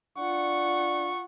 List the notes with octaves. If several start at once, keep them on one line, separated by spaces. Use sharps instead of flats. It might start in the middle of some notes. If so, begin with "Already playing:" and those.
D4 F4 F#5 C#6